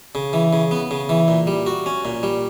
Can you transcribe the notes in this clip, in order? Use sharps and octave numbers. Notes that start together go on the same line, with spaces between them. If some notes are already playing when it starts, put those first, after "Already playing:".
C#3
E3
C#3
B3
C#3
E3
A#2
G3
F#4
C#4
A#2
G3